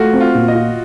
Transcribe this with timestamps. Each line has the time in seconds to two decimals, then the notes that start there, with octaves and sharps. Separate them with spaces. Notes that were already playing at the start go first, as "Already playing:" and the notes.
Already playing: A3 F4 F#4
0.13 C4
0.21 F4
0.35 A#2
0.48 D#5
0.55 F4